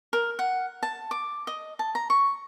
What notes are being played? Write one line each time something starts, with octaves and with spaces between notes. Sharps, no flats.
A#4
F#5
A5
D6
D#5
A5
A#5
C#6